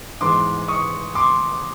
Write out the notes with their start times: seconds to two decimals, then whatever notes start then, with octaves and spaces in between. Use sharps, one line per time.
0.21 G#2 E3 G#3 B3 C6 D6
0.68 C#6 D#6
1.15 C6 D6